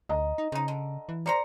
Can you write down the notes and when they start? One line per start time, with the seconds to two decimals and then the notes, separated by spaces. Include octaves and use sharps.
0.09 D2 D#5 A#5
0.38 D#4
0.52 C#3 C4 D#4
0.68 D3
1.09 E3
1.26 A#4 C5 D5 A#5 C#7